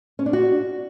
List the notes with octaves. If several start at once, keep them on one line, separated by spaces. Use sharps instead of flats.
C#4
D4
F#4